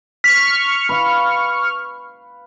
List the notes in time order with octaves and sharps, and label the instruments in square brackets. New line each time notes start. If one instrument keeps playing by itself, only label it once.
[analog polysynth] C#6 F6 [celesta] B6
[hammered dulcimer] B4 F5